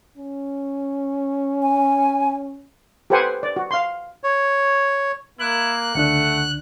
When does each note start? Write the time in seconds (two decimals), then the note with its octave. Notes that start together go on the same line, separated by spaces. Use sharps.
0.18 C#4
1.62 G#5
3.10 G4 A4 B4 C5 F#5 G#5
3.43 D5
3.56 F#4
3.71 F5 C6
4.24 C#5
5.39 A#3 E4 F#6
5.95 C#2 D3 A3 D4 F#5